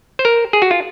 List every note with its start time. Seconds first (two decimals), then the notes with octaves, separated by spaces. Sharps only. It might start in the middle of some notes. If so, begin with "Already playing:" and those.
0.19 C5
0.25 A#4
0.53 G#4
0.62 F#4
0.71 F4